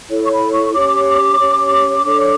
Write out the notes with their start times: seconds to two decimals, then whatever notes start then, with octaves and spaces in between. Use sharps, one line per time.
0.09 E4 A4 C#5
0.25 C#6
0.31 B5
0.52 C#6
0.73 C#4 G4 C#5 D6
1.39 C#4 G4 C#5
2.04 D4 A4 C#5